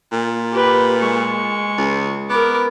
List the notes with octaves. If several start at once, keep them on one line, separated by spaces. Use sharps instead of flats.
A#2
G4 B4
G#3 C#6
C#2
B3 A#4 D6